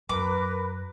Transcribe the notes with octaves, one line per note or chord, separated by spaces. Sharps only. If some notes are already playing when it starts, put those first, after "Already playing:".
F#2 A#4 B4 D6